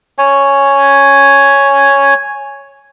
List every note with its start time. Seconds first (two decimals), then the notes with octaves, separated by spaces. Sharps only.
0.18 C#5 G#5